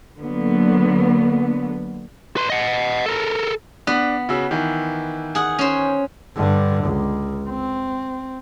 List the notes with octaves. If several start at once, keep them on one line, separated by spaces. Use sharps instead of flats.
D3 F#3 A#3 B3
B4 C6
D#5 F#5
A4 A#4
B3 D4 F#6
C#3 F#4 E6
D#3 E3
G#4 F#5
C#4 C5
G2 D3
C#2
C4